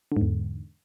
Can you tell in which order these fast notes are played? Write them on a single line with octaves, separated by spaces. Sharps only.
D3 G#2 E2